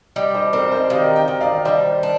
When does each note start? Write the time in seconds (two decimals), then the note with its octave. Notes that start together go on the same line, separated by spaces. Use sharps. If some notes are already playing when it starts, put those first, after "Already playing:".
0.16 G3 D#5 G5
0.34 C5 D#5
0.53 C4 A#4 D5
0.72 C5 D#5
0.90 D#3 D5 F5
1.16 D#5 G5
1.28 D#3
1.41 D5 F5
1.65 G3 C5 D#5
2.03 D4